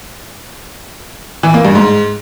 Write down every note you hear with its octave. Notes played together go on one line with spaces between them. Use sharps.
E3
A#3
G2
G#2